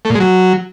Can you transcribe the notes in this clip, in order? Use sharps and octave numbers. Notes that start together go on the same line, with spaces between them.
A3
A#2
G#3
F#3